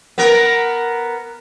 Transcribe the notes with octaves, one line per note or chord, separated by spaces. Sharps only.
B3 A#4